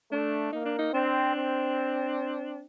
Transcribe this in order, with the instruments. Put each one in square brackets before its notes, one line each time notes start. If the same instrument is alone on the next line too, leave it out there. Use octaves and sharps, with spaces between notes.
[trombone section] A3 [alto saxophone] D4
[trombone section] A#3 [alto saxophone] D#4
[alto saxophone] D4
D#4
[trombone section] C4 [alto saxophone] D4
[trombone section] C4